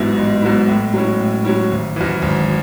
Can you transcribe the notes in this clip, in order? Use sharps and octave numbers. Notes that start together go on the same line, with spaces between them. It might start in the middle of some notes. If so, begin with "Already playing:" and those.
Already playing: A1 G#2 F#3 B3 E4
A1
G#2 F#3 B3 E4
A2
F#3 C#4 E4
A2
F#3 C#4 E4
G#1
F#2 E3
G#1